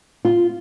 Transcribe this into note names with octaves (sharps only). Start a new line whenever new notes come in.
F4